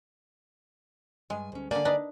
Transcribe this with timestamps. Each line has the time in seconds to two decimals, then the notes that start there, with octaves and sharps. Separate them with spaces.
1.30 G2 G#3 G#5
1.52 D2 C#4
1.71 D3 A#3 D5 G#5
1.85 D4 D#4 B4